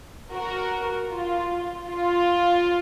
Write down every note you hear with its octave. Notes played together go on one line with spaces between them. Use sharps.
F#4 A#4
F4
F4